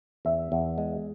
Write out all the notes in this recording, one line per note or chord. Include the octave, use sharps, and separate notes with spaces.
E2 E5
E2
G#3